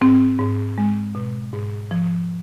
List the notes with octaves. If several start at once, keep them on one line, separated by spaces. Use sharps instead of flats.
G#2 C4
G#2
G#3
B2
G#2
F3